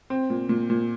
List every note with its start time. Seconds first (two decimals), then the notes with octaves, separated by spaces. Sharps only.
0.10 C4
0.30 A#2
0.49 A#2
0.70 A#2